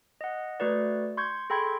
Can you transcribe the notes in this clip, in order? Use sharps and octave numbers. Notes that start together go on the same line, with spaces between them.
D#5 F#5
A3 F#4 B4 D5
C6 C#6 G6 G#6
G#4 A4 G5 B5 C6 G#6